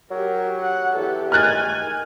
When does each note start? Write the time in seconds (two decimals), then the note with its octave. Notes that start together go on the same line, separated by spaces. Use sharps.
0.11 F#3 G4 A#4
0.60 F#5
0.95 E2 G4 A4
1.32 D#3 G#5 F6 F#6 A6